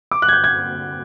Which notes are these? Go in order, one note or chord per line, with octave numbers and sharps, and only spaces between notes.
D6
F#6
G#6
G6
G#6